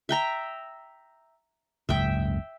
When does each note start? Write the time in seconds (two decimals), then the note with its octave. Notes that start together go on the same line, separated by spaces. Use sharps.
0.09 E5 G5 A#5
1.89 F#1 C#2 G#2 E5 G5